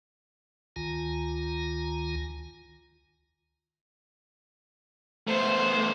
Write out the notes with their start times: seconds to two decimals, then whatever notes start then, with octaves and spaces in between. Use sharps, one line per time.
0.76 D2 D#3 F4 G#5 A#5
5.27 A3 B3 C5